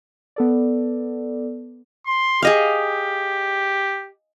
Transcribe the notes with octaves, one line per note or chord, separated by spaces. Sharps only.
B3 A4 D5
C6
G4 G#4 D#5 F5